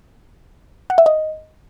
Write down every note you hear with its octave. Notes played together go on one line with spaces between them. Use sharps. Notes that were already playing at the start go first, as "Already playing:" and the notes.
F#5
E5
D#5